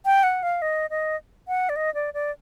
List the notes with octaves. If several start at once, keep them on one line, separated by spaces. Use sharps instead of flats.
G5
F#5
F5
D#5
D#5
F#5
D5
D#5
D5
D5